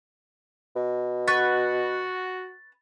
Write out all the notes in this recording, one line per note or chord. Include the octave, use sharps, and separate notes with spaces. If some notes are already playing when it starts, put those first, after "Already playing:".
B2
F#4 B4 C#6 A6